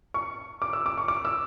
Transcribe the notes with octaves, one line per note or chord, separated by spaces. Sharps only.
C#6
D6
E6
D6
C#6
D6
E6